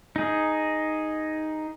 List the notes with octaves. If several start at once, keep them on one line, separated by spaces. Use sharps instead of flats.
D#4 G#4